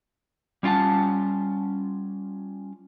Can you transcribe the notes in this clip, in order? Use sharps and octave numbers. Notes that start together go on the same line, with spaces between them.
G3 C#4 F4 D5 F#5 A5